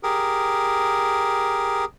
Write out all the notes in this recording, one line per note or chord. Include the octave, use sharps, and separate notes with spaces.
G4 G#4 A#4